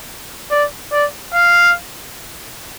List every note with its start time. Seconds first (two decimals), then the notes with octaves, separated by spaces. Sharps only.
0.51 D5
0.92 D5
1.34 F5